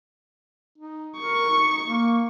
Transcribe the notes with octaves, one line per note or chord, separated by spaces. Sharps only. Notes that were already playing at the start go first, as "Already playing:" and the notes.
D#4
A#4 C#6
D#4
A#3